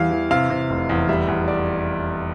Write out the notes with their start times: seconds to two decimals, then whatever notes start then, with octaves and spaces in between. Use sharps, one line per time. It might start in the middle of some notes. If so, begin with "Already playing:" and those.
Already playing: E2 E3 G3 F5
0.11 E3
0.31 C3 F5
0.50 C3
0.70 F1
0.89 E2
1.09 G3 E5
1.28 E2
1.48 D5